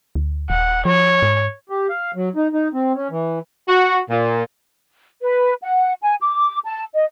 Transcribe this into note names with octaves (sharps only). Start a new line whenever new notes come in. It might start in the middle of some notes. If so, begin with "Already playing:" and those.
D2
D#1 F#5
F3 C#5
G#2
G4
F5
F#3
D#4
D#4
C4
C#4
E3
F#4
A#2
B4
F#5
G#5
D6
A5
D#5